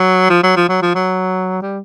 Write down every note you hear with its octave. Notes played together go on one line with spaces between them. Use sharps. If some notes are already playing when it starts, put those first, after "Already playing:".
Already playing: F#3
F3
F#3
F3
F#3
F3
F#3
G3